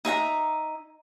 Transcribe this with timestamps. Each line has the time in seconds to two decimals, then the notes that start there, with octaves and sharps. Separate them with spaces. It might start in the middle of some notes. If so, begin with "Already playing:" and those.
0.05 D#4 E5 F#5 A#5